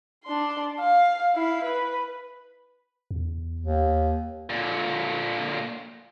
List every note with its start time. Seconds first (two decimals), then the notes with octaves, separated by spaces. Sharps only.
0.24 D4 C6
0.80 F5
1.35 E4 F5
1.64 B4
3.11 E2
3.60 D#2
4.50 A#2 D3